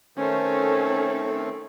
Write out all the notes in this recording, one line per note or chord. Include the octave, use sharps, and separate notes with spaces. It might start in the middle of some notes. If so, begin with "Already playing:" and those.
D#3 A3 C4 C#4 A4